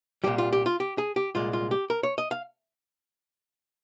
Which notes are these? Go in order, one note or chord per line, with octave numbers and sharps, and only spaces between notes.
C2 A#2 G3 G4
F4
G4
F4
G4
G#4
G4
C2 A#2 G#3 F4
F4
G4
A#4
C#5
D#5
F5